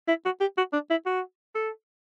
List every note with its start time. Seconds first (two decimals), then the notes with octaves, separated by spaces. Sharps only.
0.08 E4
0.25 F#4
0.40 G4
0.57 F#4
0.73 D4
0.90 E4
1.06 F#4
1.55 A4